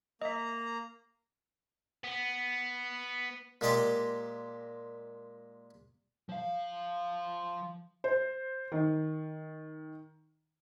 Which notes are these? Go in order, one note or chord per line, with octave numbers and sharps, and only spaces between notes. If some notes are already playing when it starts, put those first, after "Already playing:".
A#3 D#5 E5 A#5
B3
A#2 G#3 G4 D5 D#5 D6
F3 F5
C5
D#3